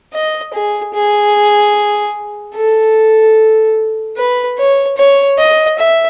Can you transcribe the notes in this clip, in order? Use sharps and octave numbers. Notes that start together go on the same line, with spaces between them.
D#5
G#4
G#4
A4
B4
C#5
C#5
D#5
E5